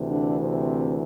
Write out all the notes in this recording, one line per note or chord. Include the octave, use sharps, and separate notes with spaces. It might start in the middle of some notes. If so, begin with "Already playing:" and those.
Already playing: D2 C3 E3
D3 D4
C3 C4